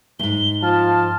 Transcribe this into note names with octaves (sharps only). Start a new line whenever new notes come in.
E2 G#2 G7
F3 A5 F6